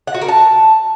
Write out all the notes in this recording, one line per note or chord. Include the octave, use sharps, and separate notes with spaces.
F#5
F#4
A#4
A5